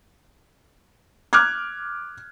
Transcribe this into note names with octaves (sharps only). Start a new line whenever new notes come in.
D6 F6 F#6 G#6